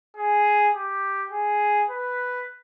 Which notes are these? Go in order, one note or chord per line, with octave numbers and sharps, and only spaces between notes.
G#4
G4
G#4
B4